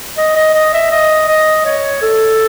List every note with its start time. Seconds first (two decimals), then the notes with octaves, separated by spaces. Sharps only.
0.17 D#5
0.36 D#5
0.54 D#5
0.73 E5
0.91 D#5
1.28 D#5
1.65 C#5
2.02 A4